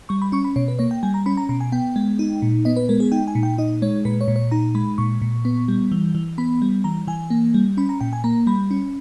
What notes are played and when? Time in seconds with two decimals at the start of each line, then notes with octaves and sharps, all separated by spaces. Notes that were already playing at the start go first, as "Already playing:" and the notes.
0.09 G3 C#6
0.22 B5
0.32 C#4 C#6
0.44 B5
0.56 B2 C#5
0.68 B4
0.79 A#3 C#5
0.91 G5
1.03 G3 G#5
1.14 A#5
1.26 C#4 B5
1.37 A#5
1.49 B2 A#5
1.60 G#5
1.72 B3 G5
1.96 G#3
2.19 D#4
2.42 A#2
2.65 B3 D#5
2.77 B4
2.89 G#3 A#4
3.00 G#4
3.12 D#4 G5
3.28 G#5
3.35 A#2
3.43 G5
3.58 D#4 D#5
3.82 G#3 C#5
4.05 A#2 B4
4.21 C#5
4.28 A#2
4.36 C#5
4.51 D#4 A#5
4.75 G#3 B5
4.98 A#2 C#6
5.22 A#2
5.45 B3
5.68 G3
5.92 E3
6.15 E3
6.38 B3 B5
6.62 G3
6.84 E3 A#5
7.07 E3 G#5
7.30 A#3
7.54 G3
7.77 C#4 B5
7.89 A#5
8.01 A#2 G5
8.13 G#5
8.24 A#3 A#5
8.47 G3 B5
8.71 C#4